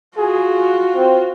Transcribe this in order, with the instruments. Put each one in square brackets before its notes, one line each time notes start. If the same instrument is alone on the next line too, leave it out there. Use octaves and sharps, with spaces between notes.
[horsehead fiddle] F4 F#4 [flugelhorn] G#4
[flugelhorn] C4